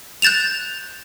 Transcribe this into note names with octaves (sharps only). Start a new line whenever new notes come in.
F#6 G6 A6 E7 F7